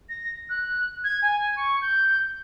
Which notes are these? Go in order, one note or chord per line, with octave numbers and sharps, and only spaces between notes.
A#6
F#6
G#6
G#5
C#6
G6